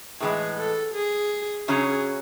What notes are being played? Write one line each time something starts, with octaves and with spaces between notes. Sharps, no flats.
A2 E3 G#3 G#4
A4
G#4
C#3 F#3 C#4 G#4